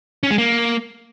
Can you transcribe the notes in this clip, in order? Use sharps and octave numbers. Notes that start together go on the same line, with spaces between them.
C#4
G#3
A#3